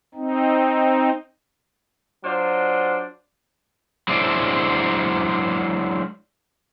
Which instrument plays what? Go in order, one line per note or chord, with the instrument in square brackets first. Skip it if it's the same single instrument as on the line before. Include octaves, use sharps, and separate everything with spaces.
[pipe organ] C4 D#4
[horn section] F#3 D4 F4 C5 D5
[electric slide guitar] F#3 G#3 D4 E4 C5 D5